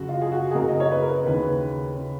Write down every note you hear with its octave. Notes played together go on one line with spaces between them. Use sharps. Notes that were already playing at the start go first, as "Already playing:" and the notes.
Already playing: F#2 C#3 F#4
F4
G#4
F#4
G#4
F#2 C#3 A#4
D#5
C#5
B4
A#4
D#2 C#3 B4
C#3